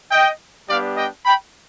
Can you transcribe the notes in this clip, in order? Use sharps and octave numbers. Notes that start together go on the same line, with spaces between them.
D#5 G5
G3 B3 D4 G4 D5 F5
D#5 G5
G5 B5